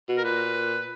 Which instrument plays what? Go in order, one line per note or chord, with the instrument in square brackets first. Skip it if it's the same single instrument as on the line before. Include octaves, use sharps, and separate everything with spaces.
[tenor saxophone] B2
[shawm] A#4
[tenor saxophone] A#2 [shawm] B4